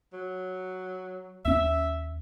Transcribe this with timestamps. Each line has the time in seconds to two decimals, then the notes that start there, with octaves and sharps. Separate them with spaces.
0.13 F#3
1.45 D#2 C#4 E5